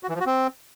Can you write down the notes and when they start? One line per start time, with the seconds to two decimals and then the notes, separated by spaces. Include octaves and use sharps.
0.03 F#4
0.09 E3
0.15 F3
0.20 F#4
0.26 C4